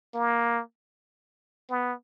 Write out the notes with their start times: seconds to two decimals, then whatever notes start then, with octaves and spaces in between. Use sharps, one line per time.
0.15 A#3
1.70 B3